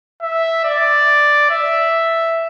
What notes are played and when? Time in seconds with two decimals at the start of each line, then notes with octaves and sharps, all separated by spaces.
0.22 E5
0.65 D5
1.51 E5